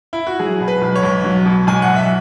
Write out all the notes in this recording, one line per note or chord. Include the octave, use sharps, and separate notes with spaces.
E4
F#4
F#3 G#4
B2
B4
B1
C#5
B1
F#3
B2
B1 G#5
F#5
B1
E5